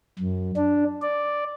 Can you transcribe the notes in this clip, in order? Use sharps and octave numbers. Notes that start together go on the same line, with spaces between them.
F#2
D4
D5